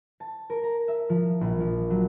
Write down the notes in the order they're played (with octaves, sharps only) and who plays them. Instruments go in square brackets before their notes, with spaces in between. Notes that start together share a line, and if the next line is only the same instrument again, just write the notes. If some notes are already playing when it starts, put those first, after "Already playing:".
[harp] A5
A#4
A#5
E5
F3
A#1
F3
F#3